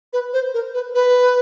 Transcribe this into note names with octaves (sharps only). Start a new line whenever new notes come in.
B4
C5
A#4
B4
B4